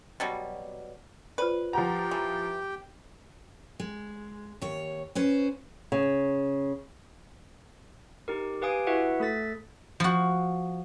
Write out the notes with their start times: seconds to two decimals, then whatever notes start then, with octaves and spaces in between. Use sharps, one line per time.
0.20 B2 F#3 G3
1.38 F4 B4 C5 D5
1.73 F3 G4 F#5 G5 A#5
2.11 E3
3.80 G#3
4.61 D#2 C#5
5.15 C#4 B4 C5
5.92 C#3
8.28 D#4 G4 A#4
8.62 G4 B4 F5 G#5 D#6 D7
8.87 E4 F#4 B4 E5 F#5
9.20 A3 A4 A6 B6
10.00 F3 F#4